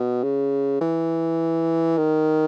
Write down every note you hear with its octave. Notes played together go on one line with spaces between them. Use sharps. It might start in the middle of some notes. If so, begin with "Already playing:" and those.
Already playing: B2
C#3
E3
D#3